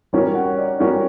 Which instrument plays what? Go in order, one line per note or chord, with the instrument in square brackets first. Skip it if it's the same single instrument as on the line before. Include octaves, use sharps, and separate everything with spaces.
[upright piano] G3 C#4 F#4 A#4 [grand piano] C#5
[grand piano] F#5
D5
[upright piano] G3 C#4 F#4 A#4